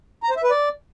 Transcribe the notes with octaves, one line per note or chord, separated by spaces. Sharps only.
A#5
C5
E5
B4
D5